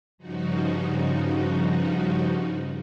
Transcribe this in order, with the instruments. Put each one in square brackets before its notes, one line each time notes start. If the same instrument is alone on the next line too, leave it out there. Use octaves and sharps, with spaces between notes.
[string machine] G2 C#3 F3 D#4 F#4